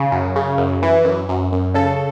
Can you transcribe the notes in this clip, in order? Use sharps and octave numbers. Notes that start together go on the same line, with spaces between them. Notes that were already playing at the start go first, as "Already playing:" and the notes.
Already playing: C#3
F#2
C#3
F#2
E3
F#2
F#2
F#2
C#3 A4